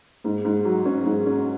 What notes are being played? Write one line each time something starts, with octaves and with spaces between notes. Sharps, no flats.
G#2
G#2
F#3
C#4
G#2
C#4